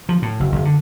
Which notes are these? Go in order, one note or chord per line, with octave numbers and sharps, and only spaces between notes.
F3
A2
F#1
F#1
D3